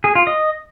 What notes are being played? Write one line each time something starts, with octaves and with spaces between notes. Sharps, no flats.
G#4
F4
D#5